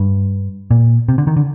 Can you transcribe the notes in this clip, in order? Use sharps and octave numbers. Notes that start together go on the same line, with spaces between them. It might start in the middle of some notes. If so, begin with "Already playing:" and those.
Already playing: G2
A#2
C3
D3
D#3
D3